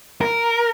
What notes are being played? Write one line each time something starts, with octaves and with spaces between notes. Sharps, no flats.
A#4